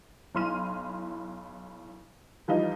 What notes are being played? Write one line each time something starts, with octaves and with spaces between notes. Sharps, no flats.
B1 E4 C6 F6 D#7
E3 F3 G3 D#4 F4